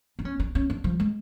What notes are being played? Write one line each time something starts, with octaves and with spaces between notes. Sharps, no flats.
D4
C#4
D4
C#4
D4
F3
G#3